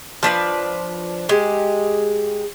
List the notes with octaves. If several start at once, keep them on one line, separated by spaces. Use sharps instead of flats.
F3 D4 B4 D5
G#3 G4